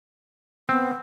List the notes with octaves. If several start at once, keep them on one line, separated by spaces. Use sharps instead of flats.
B3 C4